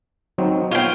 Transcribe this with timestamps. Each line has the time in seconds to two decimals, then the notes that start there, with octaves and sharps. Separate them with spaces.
0.38 F#3 C4 D#4
0.71 B3 F4 C#5 G5